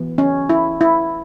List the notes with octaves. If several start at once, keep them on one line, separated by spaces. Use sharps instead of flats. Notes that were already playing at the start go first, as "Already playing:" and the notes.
Already playing: E3 B3
C#4
E4
E4